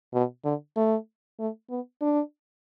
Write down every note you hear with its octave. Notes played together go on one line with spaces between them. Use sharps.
B2
D3
A3
A3
B3
D4